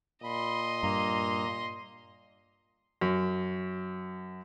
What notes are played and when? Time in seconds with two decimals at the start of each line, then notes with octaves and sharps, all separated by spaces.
0.23 A#2 D#5 B5 C6
0.83 G2 A#3 A#5
3.01 F#2